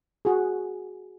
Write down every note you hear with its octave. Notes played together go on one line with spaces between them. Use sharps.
F#4 G#4